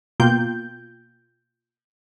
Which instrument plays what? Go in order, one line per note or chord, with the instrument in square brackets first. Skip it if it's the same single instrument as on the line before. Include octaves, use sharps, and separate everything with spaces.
[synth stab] B2 A#3 F4 G5 G6